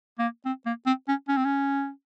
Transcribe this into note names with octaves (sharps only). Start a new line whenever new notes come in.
A#3
C4
A#3
C4
C#4
C#4
C4
C#4